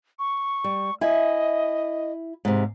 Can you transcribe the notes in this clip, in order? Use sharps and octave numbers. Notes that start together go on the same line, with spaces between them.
C#6
G3
E4 D#5 E5 G#5
G#2 C3